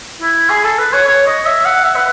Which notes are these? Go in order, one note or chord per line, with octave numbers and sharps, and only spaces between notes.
E4
G#4
A4
B4
C#5
C#5
D#5
E5
F#5
E5
B4